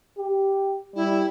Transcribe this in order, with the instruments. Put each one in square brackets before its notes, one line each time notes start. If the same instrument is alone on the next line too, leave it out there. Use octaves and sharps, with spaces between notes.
[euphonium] G4
[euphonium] G3 [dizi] E4